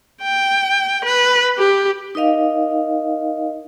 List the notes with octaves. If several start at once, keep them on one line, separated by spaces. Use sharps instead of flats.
G5
B4
G4
D#4 A#4 D#5 F5